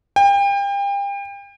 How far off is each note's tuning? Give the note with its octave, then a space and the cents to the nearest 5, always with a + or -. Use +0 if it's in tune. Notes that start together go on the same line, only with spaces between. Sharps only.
G5 +35